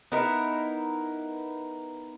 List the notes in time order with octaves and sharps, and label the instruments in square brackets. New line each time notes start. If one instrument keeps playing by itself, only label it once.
[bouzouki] B3 D#4 E4 A#4